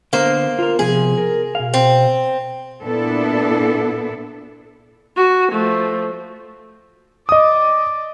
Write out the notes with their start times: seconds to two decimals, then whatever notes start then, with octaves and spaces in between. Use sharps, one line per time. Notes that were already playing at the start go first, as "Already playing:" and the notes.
0.13 D3 A#3 B3 C5
0.59 F4 A#4
0.79 C3 F3 B3 G#4
1.17 A#4
1.55 B2 F5
1.74 C4
2.83 A#2 B3 D4 E4 A4
5.17 F#4
5.51 F3 A3
7.29 D5 D#5 D#6